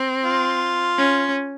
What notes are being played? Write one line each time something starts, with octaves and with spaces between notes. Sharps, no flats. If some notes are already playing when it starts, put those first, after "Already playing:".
Already playing: C4
F4
C#4